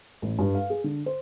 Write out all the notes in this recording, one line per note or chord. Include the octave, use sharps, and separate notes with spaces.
A1
G2
F5
G#4
D3
C5